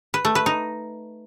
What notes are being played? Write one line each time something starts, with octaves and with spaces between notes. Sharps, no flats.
B4
A3
B4
D#4